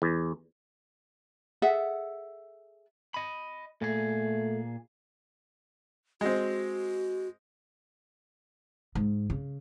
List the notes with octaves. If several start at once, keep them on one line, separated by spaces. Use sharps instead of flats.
E2
G#4 A4 E5 F#5
D#5 B5
A#2 A3 G#4
G#3 C4 F#4
G#2
C#3